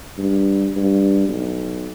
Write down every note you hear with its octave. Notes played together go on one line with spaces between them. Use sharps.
G2
G2
B1